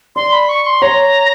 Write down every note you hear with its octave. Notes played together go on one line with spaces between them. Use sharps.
D5 C6
B5
C#6
C6
C#5 A#5